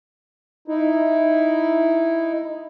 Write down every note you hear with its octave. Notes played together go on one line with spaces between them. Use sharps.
D#4 E4